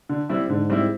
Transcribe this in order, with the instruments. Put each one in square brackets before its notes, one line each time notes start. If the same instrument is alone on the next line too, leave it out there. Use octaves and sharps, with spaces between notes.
[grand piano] D3
G3 C4 E4
[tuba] G#2 [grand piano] D3
[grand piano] G3 C4 E4